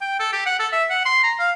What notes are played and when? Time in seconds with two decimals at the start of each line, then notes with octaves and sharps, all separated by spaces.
0.01 G5
0.19 A4
0.32 G4
0.46 F#5
0.59 A4
0.72 E5
0.90 F#5
1.05 C6
1.23 A#5
1.39 F5